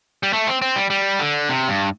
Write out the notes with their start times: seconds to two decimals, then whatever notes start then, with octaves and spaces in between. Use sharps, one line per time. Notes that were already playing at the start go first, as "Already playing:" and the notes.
0.23 G3
0.33 A3
0.47 C4
0.62 C4
0.76 G3
0.90 G3
1.20 D3
1.49 C3
1.68 G2